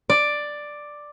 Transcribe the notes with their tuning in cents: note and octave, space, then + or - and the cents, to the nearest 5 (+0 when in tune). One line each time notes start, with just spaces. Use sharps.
D5 +5